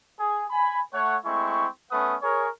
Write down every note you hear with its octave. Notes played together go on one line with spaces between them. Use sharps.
G#4
G#5 B5
A3 C#5 F#5
G#3 A3 C4 E4 C#6
A3 B3 C#4 B4 F#5 D#6
G#4 A#4 C#5